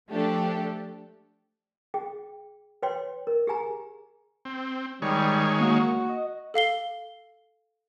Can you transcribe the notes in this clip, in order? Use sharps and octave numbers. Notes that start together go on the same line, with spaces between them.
F3 A3 D4 G4 A4
G#4 G5
B4 C#5 G5 C6
A#4
G4 G#4 G#5 A#5
C4
D#3 G3 G#3 C#5
A#3 F#4
D#5
A4 F5 C7 G7